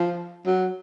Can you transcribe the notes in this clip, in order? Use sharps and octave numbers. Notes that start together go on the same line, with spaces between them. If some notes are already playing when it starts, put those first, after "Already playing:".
Already playing: F3
F#3